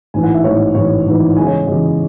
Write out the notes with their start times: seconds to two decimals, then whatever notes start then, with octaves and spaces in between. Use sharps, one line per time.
0.14 A1 G#2 E3 G#5
0.24 F#5
0.34 E5
0.44 A1 G#2 E3 C#5
0.75 A1 G#2 E3 C#5
1.06 A1 G#2 E3
1.37 E2 C#3 G#3 G#5
1.47 C#5
1.67 E2 C#3 G#3